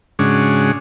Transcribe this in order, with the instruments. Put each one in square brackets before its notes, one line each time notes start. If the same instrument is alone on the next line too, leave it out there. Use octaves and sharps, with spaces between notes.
[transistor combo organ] G#2 C#3 G#3 C#4 D4 F#4